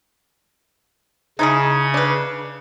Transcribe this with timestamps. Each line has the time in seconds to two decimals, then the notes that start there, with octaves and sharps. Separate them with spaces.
1.39 C#3 D#4 E4 G#4 G#6
1.94 D4 B4